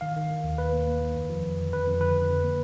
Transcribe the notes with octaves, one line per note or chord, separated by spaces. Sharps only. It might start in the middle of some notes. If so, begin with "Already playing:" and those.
D#3 F5
D#3
D#3
D#2
D#2 B4
A#3
A#3
D#3
F2
F3
F2
D3
F2 B4
F2
D3 B4
F2
D3
A#3